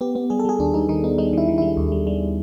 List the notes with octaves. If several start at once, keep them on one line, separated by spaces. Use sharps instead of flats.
B3 G4
B3
G3 G#4
A4
G3 G#4
D#2 D4
G3 D#4
D#3 D#4
B3 D#4
G3 D#4
D#3 E4
D#3
G3 E4
D#2
G3
G3